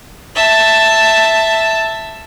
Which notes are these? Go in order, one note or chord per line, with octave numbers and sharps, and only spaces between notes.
E5 A5